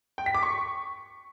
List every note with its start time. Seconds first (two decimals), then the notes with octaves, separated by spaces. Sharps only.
0.18 G5
0.26 B6
0.34 D6
0.43 C#6